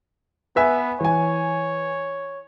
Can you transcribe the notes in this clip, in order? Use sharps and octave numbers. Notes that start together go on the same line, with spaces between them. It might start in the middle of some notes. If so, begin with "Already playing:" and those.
B3 B4 E5 G#5
E3 C#5 G#5